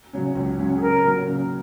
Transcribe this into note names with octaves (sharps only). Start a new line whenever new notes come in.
C#3 F#3 C#4
C#2
C#3 F#3 C#4
G#4
C#3 A#4
F#3 A#3
C#3